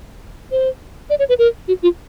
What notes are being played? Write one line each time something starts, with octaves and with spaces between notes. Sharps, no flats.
C5
D5
C#5
B4
A#4
F#4
F4